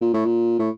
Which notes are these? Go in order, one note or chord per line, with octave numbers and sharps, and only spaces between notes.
A#2
A2
A#2
A2